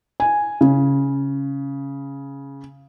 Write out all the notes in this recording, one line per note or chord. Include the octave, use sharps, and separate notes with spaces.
G#5
C#3